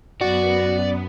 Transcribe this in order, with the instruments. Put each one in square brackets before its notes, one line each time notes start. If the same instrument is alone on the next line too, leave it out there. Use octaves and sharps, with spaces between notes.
[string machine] F#2 B3 [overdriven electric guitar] F#4 [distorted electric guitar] D5